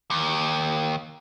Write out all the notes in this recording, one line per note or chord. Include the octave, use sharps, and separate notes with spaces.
D#2